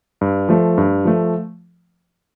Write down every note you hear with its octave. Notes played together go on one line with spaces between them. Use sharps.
G2
F3 A3
G2
F3 A3